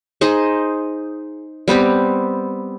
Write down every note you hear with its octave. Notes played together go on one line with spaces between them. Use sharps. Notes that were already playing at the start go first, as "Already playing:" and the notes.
D#4 G#4 C5 D#5
G3 B3 C4 G4